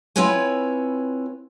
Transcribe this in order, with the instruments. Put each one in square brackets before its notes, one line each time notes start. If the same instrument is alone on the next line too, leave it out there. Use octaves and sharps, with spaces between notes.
[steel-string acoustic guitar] C4 E4 F4 B4 C#5 G#5